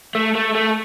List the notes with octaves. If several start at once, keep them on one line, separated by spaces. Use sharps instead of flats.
A3
A3
A3